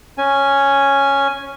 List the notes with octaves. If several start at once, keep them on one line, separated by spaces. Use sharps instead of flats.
C#4 G#5